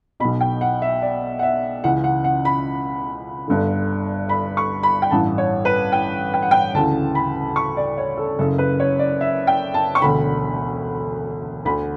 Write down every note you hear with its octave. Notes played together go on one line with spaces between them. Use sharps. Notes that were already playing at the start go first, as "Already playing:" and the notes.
B1 B2 B5
G5
F#5
E5
D5
F#5
E5
C#2 C#3 E3 F#5
F#5
F#5
B5
G1 G2 D3
B5
C#6
B5
G5
A1 G2 E3 A5
C#5
B4
G5
G5
F#5
G5
D2 C#3 E3 A5
B5
C#6
D5
C#5
A4
F#1 F#2 C#3 A4
B4
C#5
D5
E5
G5
A5
C#6
E1 D2 D3 B5
D2 D3 B5